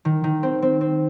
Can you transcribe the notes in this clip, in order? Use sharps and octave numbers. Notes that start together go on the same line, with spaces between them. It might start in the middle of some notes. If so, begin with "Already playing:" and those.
D#3
D#3
C4
C4
C4